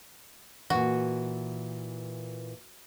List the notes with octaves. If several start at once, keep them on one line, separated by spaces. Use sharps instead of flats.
A#2 E3 F#4